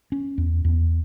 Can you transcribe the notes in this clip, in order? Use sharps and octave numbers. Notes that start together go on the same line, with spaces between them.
C#4
E2
E2